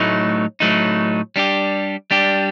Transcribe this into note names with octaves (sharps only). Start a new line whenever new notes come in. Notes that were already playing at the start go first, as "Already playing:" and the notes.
Already playing: A2 F#3 A3 D#4
A2 F#3 A3 D#4
G3 D4 G4
G3 D4 G4